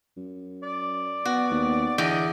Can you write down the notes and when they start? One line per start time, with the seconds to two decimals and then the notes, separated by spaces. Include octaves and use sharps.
0.17 F#2
0.63 D5
1.25 B3 F#4
1.51 D#2
1.98 E2 D3 D5 D#5 G5